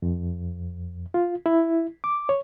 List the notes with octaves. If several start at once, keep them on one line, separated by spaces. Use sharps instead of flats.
F2
F4
E4
D6
C#5